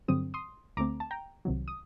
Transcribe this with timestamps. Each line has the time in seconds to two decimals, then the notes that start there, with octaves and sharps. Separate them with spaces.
0.08 G2 D3 F#3 C4 D#6
0.34 C6 D#6
0.77 D2 D3 A3 C4 A#5 D6
1.00 A5
1.11 G5 A#5
1.45 C2 C3 D#3 F#3
1.68 D#6